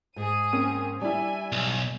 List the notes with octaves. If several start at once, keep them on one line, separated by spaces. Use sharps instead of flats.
G#2 G#4 D#7
A#3 C4 C#4
G3 D4 E4 G#5
B1